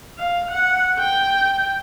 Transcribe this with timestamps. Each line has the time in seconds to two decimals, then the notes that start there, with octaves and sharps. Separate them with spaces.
0.18 F5
0.51 F#5
0.99 G5